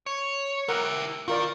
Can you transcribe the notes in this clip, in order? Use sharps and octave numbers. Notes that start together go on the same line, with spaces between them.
C#5
E4 G4 A#4 F#5
D#3 F4 A#4 D5